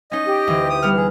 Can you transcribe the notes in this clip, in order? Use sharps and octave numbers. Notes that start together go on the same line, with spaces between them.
C#4 D#4 D#5
G4
D2 E3
D#6
G3 B3 F6
G#4